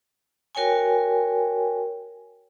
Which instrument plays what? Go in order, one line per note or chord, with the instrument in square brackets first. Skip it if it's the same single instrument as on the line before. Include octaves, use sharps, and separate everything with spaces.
[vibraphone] F#4 A#4 C#5 G5 G#5